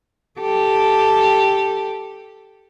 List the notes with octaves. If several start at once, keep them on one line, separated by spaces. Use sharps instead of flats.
G4 A4